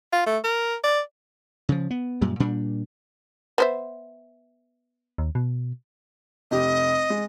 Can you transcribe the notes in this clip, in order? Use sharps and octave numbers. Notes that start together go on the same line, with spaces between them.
F4
A3
A#4
D5
C#3 F3
B3
F#2 A#2 G3
A#2 G3 D4
B3 C5 E5
D#2
B2
F1 G4 D#5
G#3